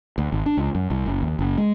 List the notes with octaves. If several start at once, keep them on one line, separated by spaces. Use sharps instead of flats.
D2
G#1
D4
C#2
F#2
C2
F#1
D#2
F#1
G#3